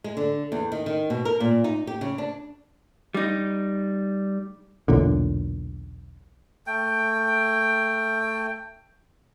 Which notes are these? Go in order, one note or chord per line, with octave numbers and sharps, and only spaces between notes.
G#3
D3
E2
D#3
D#3
B2
A#4
A#2
D#4
G4
C#3
D4
G3 D#4
B1 E2 A#2 D3
A3 G5